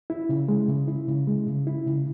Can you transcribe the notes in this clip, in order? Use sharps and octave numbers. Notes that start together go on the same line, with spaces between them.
E4
C#3
G#3
C#3
E4
C#3
G#3
C#3
E4
C#3